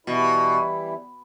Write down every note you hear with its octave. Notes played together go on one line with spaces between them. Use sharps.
B2 E3 G3 E4